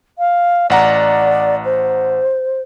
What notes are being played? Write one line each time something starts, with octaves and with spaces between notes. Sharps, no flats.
F5
A1 D5 F#5 A#5
C5